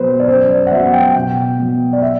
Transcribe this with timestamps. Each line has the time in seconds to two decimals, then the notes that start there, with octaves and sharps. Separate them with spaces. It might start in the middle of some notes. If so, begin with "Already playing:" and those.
Already playing: B2 F#3 B3 B4 C5
0.19 D5
0.28 F#2 C5
0.50 D5
0.67 F#5
0.71 F#3 B3 E5
0.93 G5
1.15 B2 G5
1.58 F#3 B3
1.93 D5
2.02 E5